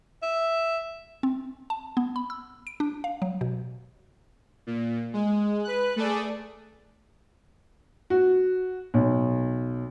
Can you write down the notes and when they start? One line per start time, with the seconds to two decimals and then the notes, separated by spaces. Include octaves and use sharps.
0.23 E5
1.23 C4
1.70 A5
1.97 B3
2.16 B5
2.30 E6
2.67 D7
2.80 D4
3.04 F5
3.22 F#3
3.41 B2
4.67 A#2
5.13 G#3
5.64 B4 F#6
5.96 A3 G#4 A4 D5
8.10 F#4
8.94 B1